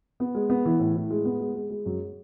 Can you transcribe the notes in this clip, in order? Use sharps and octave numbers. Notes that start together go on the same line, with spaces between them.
B3
G#3
B3
E3
A2
A2
G#3
B3
G#3
G#3
G#3
F#2